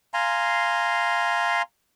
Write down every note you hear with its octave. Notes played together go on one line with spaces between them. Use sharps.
F5 G#5 A#5 C6